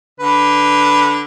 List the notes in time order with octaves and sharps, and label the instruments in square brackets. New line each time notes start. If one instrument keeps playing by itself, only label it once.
[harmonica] D3 B4